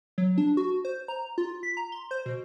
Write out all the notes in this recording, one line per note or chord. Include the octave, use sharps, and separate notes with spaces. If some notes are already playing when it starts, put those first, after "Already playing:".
F#3
D4
F#4
C5
A#5
F4
B6
A#5
C6
C5
B2